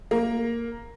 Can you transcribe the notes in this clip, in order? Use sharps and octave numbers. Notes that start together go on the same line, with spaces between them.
A#3